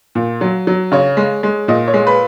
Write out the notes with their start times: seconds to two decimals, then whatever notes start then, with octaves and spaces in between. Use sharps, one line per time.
0.15 A#2
0.41 F#3
0.67 F#3
0.92 C#3 C#5
1.17 G#3
1.43 G#3
1.68 A#2 D#5
1.88 C#5
1.94 G#3
2.07 B4